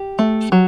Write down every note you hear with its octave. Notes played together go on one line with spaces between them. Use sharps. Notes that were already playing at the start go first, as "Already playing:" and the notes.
Already playing: G4
A3
F#3